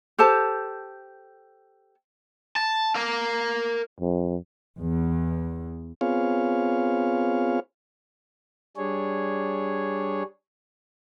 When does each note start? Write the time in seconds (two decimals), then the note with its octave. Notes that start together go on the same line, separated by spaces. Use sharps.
0.19 G4 A4 C5 A5
2.56 A5
2.95 A#4 F5
4.00 F2
4.78 E2
6.01 B3 C4 F4 G#4 C#5 F5
8.77 G3 D4 G#4 C#5